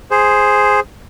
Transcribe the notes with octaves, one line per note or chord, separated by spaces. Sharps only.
G#4 C5